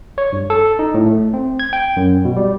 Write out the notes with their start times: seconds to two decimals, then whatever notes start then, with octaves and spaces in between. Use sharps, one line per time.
0.18 C#5
0.32 G2
0.50 A4
0.79 D#4
0.94 A2
1.06 A3
1.34 C4
1.60 G#6
1.73 G5
1.97 F#2
2.25 B2
2.36 G3